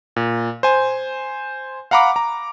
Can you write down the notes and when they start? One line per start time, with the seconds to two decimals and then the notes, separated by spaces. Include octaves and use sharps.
0.16 A#2
0.63 C5 G#5
1.91 F5 F#5 A#5 B5 D6
2.16 A#5